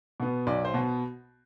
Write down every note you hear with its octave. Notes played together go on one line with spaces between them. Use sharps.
B2 B3
B1 D5
C5
B2 B3